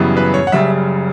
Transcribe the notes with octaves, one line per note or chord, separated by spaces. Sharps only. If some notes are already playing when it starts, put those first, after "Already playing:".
Already playing: F#2 C#3 E3 G3 B3
B4
C#5
F#5
F#1 F#2 C#3 G3 E5